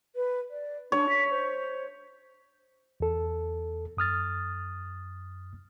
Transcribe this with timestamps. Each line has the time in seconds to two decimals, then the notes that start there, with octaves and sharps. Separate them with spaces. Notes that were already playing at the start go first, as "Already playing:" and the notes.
0.16 B4
0.50 D5
0.92 D4 C#5
1.09 B6
1.31 C5
3.00 E2 A4
3.97 F#2 D#6 F6 A6